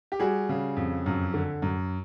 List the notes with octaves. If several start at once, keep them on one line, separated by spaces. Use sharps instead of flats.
G4
G3 F#4 G#4
C#3
F2
F#2
D3
F#2